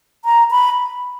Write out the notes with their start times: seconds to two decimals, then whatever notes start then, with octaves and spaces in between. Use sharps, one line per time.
0.25 A#5
0.51 B5